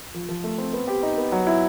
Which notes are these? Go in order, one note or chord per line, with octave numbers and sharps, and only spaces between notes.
F3
F3
A3
C4
B3
G4
D#4
B3
F#3
E4